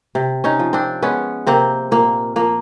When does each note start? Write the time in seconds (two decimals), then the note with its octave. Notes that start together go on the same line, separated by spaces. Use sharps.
0.15 C3
0.44 C#4 D#4
0.59 F3
0.73 C4 D4
1.02 G#3 B3 C#4
1.47 C3 A#3 C4
1.91 A#2 A#3
2.36 F3 A#3